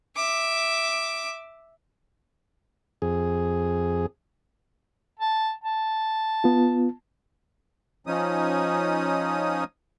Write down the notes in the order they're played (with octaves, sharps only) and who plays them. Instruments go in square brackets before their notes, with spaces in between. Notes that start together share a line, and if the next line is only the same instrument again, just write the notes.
[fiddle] E5 D6
[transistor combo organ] F2 G#4
[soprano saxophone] A5
A5
[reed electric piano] B3 F4
[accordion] F3 C#4 D#4 D#6